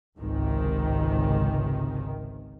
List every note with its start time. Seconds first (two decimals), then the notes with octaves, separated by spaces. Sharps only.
0.19 G#1 C#2 G#2 C3 D#3